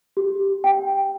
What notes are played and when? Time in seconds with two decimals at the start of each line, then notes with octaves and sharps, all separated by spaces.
0.17 G4
0.64 G5